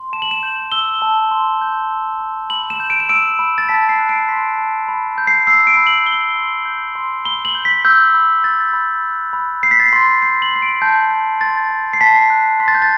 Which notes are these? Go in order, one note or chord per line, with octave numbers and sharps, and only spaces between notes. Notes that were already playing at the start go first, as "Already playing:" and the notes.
Already playing: C6
A5 E7
F#7
E7
G6
E6 G7
A5
C6
G6
E6
C6
B5 F#7
E7
G6
D7
E7
E6 D7
B5
A6
A5 B6
C7
F#6
D7
C6 B6
A5
B5
G6
C7
E6 C7
D7
B5
F#7
G6 G7
C6
G6
C6
B5 G7
F#7
G6
B6
E6 G6
B5
F#6 A6
B5
F#6
B5
G6 C7
B6
A6
C6 B6
G6 C7
F#7
C6 C7
D7
A5 G6
G6
C6 A6
A5
C7
A5 B6
F#6
C6 B6
A6
G6
A6